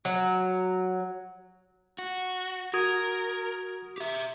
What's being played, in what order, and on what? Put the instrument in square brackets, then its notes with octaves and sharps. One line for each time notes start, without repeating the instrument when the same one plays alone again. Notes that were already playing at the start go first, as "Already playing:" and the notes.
[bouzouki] F#3
[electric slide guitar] F#4
[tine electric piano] F#4 D#6 G#6 [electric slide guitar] A#4
[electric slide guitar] G4 E5